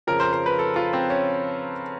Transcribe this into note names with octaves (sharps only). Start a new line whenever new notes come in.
F2 C#3 F3 A#4
C5
C5
B4
A4
F4
C4
C#4